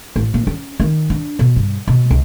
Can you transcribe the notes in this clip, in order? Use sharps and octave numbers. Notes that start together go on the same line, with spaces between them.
A1
A#2
C#4
D#3
D4
B2
G2
B2
C#2